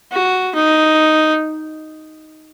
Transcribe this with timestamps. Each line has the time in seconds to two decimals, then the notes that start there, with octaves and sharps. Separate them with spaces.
0.12 F#4
0.55 D#4